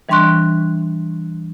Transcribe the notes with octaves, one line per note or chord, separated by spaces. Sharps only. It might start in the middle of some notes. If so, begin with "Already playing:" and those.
E3 G3 D4 C6 C#6 F#6